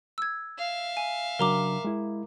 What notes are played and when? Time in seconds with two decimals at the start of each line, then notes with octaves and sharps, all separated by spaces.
0.18 E6 G#6
0.59 E5 F5
0.97 G#5
1.39 C#3 F#3 D4 A#4 A#5 D6
1.85 G#3 E4